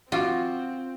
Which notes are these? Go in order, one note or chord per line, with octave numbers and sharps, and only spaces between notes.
F3 C4 F4 F#4 D6